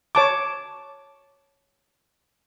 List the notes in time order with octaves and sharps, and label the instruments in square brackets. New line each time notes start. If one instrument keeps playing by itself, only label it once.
[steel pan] C#5 A5 D6